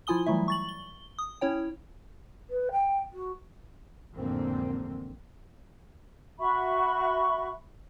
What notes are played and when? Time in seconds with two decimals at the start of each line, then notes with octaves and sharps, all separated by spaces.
0.07 F3 E4 F4 G#5 D#6 G7
0.26 E3 F#3 G3 A3 E4 E5
0.48 C#6 A6 F#7
0.69 G7
1.19 D#6
1.41 C#4 E4 C#5 G5
2.50 B4
2.71 G5
3.12 F#4
4.14 A1 F2 G#2 D3 A#3 C4
6.39 F#4 E5 B5 C#6